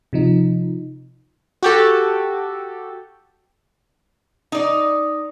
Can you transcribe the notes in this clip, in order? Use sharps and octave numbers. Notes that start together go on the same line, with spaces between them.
C3 F3 D#4
F#4 G4 A4
D#4 D5